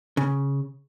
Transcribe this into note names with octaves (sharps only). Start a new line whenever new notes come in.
C#3